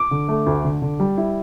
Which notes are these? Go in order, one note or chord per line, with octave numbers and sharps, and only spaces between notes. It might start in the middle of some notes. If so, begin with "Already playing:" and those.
Already playing: D6
D3
A3
D2
D3
D3
G3
E4